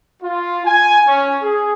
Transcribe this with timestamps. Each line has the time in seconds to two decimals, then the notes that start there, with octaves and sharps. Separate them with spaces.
0.22 F4
0.65 G#5
1.07 C#4
1.43 G#4